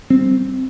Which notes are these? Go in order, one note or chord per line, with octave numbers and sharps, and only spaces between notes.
G3 C4